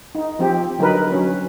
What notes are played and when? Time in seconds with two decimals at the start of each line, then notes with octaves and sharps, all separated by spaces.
0.15 D#4
0.39 F3 C4 G4
0.78 D3 F#3 D#4 A#4 B4
1.12 F#3 C#4